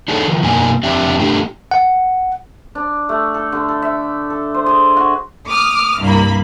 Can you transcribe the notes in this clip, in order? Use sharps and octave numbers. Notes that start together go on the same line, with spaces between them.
D4 D#4 G#4 A4 C#5
D#3 F3
F#2 B2 A#3 D4 D#4 G#5
F2 C4 D4 G4 D5 E5
A2 A3 D4 G4
F#5
D4
A3
A4
D3
A4
E5
A4
C5
G#4
F#4
D6 D#6 F6
C2 G2 A#3 B5